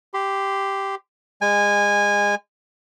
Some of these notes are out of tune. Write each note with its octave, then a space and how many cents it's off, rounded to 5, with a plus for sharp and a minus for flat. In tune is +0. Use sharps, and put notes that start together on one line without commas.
G4 +0 C6 -25
G#3 -30 G#5 -20